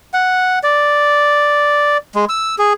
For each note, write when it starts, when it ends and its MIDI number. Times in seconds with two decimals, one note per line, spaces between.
0.14 0.59 78
0.63 1.97 74
2.15 2.25 56
2.29 2.55 88
2.58 2.73 68